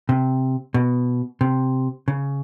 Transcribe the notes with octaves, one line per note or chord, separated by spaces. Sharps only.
C3
B2
C3
C#3